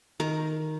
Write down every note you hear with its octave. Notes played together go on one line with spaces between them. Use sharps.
D#3 A#4